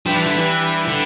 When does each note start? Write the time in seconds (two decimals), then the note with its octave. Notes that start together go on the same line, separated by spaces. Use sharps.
0.06 F3 G3 D4 G4 B4 E5
0.17 E3
0.27 D3
0.37 E3
0.88 D3